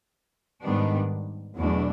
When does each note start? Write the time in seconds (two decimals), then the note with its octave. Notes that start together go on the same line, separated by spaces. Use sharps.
0.63 G#2 D#3 G3 B3 D4
1.58 E2 B2 F#3 A3 D4